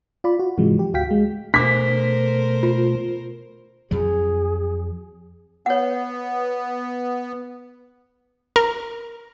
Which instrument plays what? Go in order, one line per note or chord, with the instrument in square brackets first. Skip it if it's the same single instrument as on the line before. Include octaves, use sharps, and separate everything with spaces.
[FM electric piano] F4 D5 B5
F#4
G#2 C3 E3 F3 G#3
G4
D2 F#4 F5 G5 B6
G#3
[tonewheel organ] B2 A3 [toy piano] D4 D6 [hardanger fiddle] A#4 C5 [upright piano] B6
[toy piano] F4
[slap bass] F2 F3 F#3 [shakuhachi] G#4
[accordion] B3 [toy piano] C#5 F#5
[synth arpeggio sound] A#4